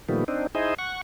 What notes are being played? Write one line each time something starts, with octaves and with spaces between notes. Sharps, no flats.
A#2 D#3 F3 G3 A3 B3
C4 D4 D#4
D#4 E4 G#4 C5 D#5
F#5 C#6